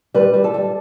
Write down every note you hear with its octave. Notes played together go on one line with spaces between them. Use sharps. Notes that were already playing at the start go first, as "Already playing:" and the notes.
G3 B4
G3
A4
G3